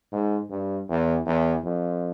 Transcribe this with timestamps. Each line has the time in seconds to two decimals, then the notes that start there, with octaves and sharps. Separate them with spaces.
0.12 G#2
0.50 G2
0.89 E2
1.26 E2
1.64 F2